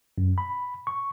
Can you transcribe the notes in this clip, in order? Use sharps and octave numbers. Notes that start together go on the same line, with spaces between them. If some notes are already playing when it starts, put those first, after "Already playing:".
F#2
B5
C#6